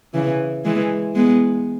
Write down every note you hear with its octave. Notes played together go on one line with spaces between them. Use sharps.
C#3 E3
E3 G#3
G#3 B3